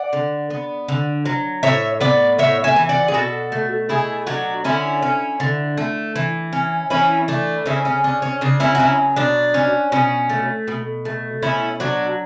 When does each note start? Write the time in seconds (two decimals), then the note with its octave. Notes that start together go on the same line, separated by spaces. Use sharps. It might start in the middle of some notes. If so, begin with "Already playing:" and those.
Already playing: D5 F#5
0.13 D3
0.50 B3
0.88 D3
1.25 F#3
1.63 A2 C#5 E5
2.00 B3 B4 D5
2.38 A2 C#5 E5
2.64 E5 G#5
2.76 E3
2.89 D5 F#5
3.08 G#4
3.14 B2 F#4 A4
3.52 A3
3.89 B2 E4 G#4
4.27 F#3 D4 F#4
4.64 D3 C#4 E4
5.02 C#4
5.40 D3
5.77 A3
6.16 E3
6.53 C#4
6.90 E3 C#4 E4
7.28 A3 D4
7.66 C#3 C#4 E4
7.85 C#4
8.04 C#4 D4
8.22 C#4
8.41 C#3 D4
8.60 C#4 E4
8.75 F#4
8.79 F#3 C#4 E4
9.16 B2 D4
9.54 C#4
9.92 B2 C#4
10.30 A3
10.68 B2
11.05 A3
11.42 B2 C#4 E4
11.80 F#3 D4 F#4